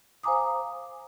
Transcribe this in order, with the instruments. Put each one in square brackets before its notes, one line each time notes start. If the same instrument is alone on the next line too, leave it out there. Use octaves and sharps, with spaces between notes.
[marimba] C5 F5 G#5 A#5 D6 D#6